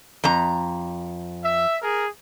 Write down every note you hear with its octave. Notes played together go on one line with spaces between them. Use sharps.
F2 A#5
E5
G#4 A#4